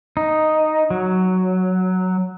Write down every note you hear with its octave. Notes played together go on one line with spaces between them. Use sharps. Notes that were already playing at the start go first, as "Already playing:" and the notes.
D#4
F#3